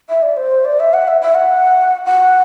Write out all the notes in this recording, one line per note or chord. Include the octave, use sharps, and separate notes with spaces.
E5
D5
C5
D5
E5
F#5
E5
E5
F#5
F#5